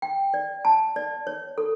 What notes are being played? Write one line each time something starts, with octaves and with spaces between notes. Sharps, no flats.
G5
D5
A5
D5
C#5
A4